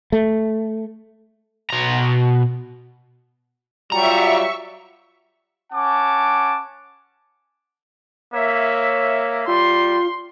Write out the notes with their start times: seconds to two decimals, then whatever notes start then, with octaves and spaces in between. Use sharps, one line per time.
0.12 A3
1.70 B2 A#5
3.92 F#3 G3 F4 E5 A#5 C#6
5.73 C#4 F#5 A5 D6
8.33 A#3 C#5 E5
9.48 G3 F4 C6